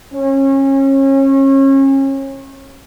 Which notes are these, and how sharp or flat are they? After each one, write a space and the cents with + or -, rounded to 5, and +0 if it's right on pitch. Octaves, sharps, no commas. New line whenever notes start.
C#4 -30